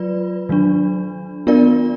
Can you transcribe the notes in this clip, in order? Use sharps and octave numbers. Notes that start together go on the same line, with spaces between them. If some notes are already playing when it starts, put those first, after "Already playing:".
Already playing: F#3 F4 B4 D5
D#3 F#3 D4
B3 D4 F4 A#4 D5